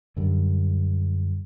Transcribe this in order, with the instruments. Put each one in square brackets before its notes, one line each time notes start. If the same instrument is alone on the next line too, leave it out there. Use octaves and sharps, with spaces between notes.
[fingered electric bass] F#2 D3 G3